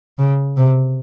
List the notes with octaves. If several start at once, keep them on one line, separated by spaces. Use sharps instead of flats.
C#3
C3